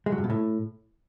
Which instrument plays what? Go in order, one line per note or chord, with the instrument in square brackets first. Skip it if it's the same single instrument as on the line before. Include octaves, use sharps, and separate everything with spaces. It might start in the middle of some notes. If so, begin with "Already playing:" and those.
[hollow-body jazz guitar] G#3
F#3
G2
B2
A2